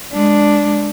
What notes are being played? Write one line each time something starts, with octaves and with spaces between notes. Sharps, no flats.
G#3 D4